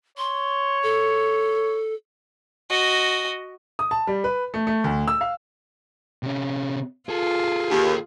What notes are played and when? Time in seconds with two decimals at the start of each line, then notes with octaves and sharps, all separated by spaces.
0.18 C#5 C6
0.83 A4
2.71 F#4 D#5
3.79 D#6
3.91 A5
4.07 G3
4.24 B4
4.54 A3
4.67 A3
4.84 D2
5.08 E6
5.21 F5
6.23 C3 C#4
7.09 F4 G#4 A4
7.70 D#2